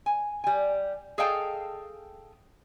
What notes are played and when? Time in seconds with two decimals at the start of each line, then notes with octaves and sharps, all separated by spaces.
0.06 G#5
0.44 G3 G#5
1.18 G#4 A4 D#5 F5 G5 A5